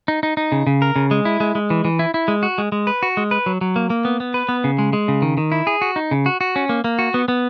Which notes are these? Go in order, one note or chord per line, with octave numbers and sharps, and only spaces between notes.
D#4
D#4
D#4
C#3
C#3
A#4
C#3
G#3
E4
G#3
G#3
E3
E3
E4
E4
G#3
F#4
G#3
G#3
B4
F#4
G#3
B4
F#3
F#3
A#3
A#3
B3
B3
B4
B3
C#3
G#3
G#3
C#3
D#3
D#3
E4
G#4
F#4
D#4
C#3
F#4
F#4
C#4
A#3
A#3
F#4
B3
B3